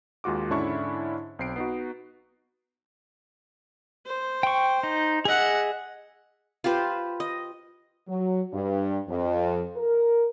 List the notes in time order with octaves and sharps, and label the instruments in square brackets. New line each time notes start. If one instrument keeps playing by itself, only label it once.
[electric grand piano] D#2 G#3 F4 F#4 D6
G#2 D3 C#4 D4 E4 C#6
B1 C4 C7 D7
B3 D#4 F#4
[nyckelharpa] C5
[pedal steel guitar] G5 C#6
D#4
[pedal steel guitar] G#4 D#5 [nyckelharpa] E5 F#5
[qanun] F4 G4 B4 C5
D#5
[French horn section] F#3
G2
F2
A#4